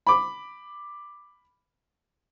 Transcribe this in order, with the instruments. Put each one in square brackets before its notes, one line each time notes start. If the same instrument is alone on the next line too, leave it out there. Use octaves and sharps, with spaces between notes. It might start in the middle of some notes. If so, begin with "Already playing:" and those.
[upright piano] B5 D6